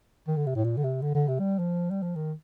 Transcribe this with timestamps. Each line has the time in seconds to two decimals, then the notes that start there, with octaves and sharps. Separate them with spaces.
0.28 D#3
0.37 D3
0.47 C3
0.56 A2
0.64 A#2
0.77 D3
0.84 C3
1.02 D3
1.15 D3
1.28 C3
1.39 G3
1.59 F3
1.91 G3
2.03 F3
2.16 D#3